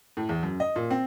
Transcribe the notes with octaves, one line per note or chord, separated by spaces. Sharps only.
A2
E2
F#2
D#5
A#2
C4